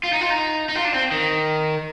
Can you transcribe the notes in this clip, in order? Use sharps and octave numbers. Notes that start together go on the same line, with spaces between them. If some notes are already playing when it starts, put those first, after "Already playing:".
F4
D#4
F4
D#4
D#4
F4
D4
C4
D#3